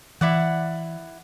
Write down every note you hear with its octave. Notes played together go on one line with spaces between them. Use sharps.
E3 E4 D5 F#5